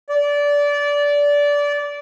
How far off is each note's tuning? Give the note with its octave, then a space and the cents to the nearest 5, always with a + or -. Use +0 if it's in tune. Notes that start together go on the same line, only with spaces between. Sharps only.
D5 -20